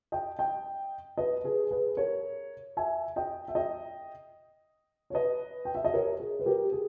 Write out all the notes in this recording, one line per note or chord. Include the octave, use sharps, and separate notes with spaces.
D#5 G5
D#5 G5
B4 D#5
G#4 B4
G#4 B4
A#4 C#5
E5 G#5
D#5 G5
E5
D#5 G5
C#5
B4 D#5
G5
E5
D#5
A#4 C#5
G#4
B4
G4 A#4
G#4